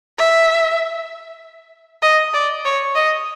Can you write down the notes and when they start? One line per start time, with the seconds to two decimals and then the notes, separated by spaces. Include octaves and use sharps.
0.19 E5
2.02 D#5
2.34 D5
2.65 C#5
2.95 D#5